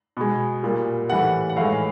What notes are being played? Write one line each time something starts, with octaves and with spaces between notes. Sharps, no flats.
B2 G#3
A#2 G3
A2 E3 G3 F#5
F#5
A2 E3 G#3 F5